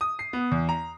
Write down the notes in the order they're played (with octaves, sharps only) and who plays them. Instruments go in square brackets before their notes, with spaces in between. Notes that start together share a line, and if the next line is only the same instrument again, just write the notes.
[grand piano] D#6
C7
B3
E2
A#5